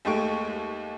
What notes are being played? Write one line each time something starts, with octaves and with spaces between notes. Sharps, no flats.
D#2 G#3 A3 G4 C#6 D7